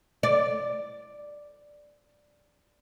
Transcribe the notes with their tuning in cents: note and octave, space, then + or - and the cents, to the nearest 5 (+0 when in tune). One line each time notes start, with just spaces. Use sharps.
D5 +0